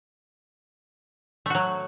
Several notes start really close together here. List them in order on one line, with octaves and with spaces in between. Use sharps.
A3 F#4 F#3